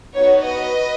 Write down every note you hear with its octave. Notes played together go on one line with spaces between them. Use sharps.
B3 D#4 F#4 C#5
B4 D#5